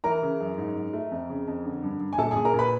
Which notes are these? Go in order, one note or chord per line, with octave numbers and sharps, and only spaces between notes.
E3 A#4 A#5
C#3
F#2
G#2
G#2
A3
F2
C#3
F2
D3
G2
G2
G#5
A#2 A4 A5
A#2 G#4 G#5
A#4 A#5
A#2
B4 B5